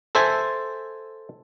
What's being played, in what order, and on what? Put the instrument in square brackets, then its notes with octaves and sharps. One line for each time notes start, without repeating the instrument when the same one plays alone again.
[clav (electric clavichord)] A4 C5 E5 G#5